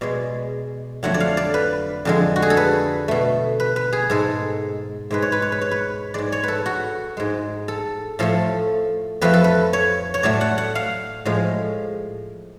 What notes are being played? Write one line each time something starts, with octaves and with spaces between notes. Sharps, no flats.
B2 G#3 D5
F2 D3 F#3 A3 F#5
D5
F5
D5
B4
F2 D3 G#3
F#4
G#4
A4
B4
B2 A3
B4
B4
G#4
G#2 G#3 A4
G#2 G#3 B4
C#5
B4
C#5
B4
C#5
B4
G#2 G#3 D5
C#5
A4 B4
F#4
G#2 G#3
A4
A2 F3 A3 A4
F2 F3 A3 B4
A4
B4
C#5
C#5
A2 F#3 A3 D5
F#5
F#5
F5
A2 F3 G#3